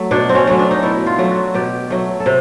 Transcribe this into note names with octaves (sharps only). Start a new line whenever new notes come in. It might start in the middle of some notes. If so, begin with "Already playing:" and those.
Already playing: F#3 A3
B2 D4
C4
C#4
F#3 A3 C#4
D4
D#4
B2 E4
F4
F#3 A3
F#4
B2 G4
F#3 A3
A4
C3